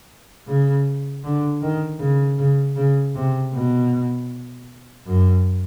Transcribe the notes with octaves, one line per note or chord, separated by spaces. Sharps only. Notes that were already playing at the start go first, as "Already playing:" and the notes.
C#3
D3
D#3
C#3
C#3
C#3
C3
B2
F#2